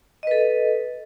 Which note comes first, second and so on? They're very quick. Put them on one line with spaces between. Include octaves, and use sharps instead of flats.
D#5 B4 A4